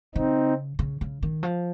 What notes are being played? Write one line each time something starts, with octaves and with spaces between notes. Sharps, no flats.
C#3 C4 D#4
C#3
C#3
D#3
F3